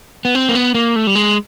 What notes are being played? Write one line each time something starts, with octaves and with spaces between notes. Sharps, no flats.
B3
C4
A#3
B3
A#3
A3
G3
G#3